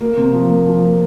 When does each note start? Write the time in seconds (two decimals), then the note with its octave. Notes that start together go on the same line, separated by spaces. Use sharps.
0.01 A#3
0.17 C3
0.33 F3
0.50 A#3
0.67 F3
0.83 A#3